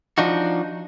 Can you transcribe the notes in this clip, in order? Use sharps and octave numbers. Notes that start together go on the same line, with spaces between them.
F3 D4 D#4 F#4